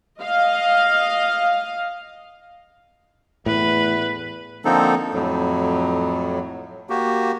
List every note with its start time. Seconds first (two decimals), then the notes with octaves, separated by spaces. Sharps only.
0.20 D#5 F5
3.46 E2 A2 B4
4.65 D3 F3 A#3 C4 D#4 A4
5.14 F2 A2 F#3
6.90 A#3 F#4 G4